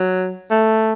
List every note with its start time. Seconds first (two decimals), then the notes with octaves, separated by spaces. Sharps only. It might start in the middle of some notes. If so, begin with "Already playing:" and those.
Already playing: F#3
0.51 A3